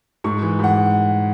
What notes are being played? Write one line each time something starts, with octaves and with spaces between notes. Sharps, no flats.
G#2 C#6
E3
G#2 F#5